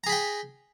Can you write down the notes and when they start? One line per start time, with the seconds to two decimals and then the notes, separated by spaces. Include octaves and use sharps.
0.04 A#5
0.07 G#4
0.09 B5
0.12 G5